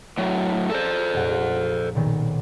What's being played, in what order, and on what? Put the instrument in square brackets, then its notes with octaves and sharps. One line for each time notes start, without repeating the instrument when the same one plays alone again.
[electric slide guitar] A2 F#3
[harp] G#4 D5 A#5 [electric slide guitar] A4 C5
[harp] F1 A#1 F#5
B1 A#2 D#3